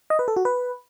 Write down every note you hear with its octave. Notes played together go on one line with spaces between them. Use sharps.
D#5
B4
A4
F#4
B4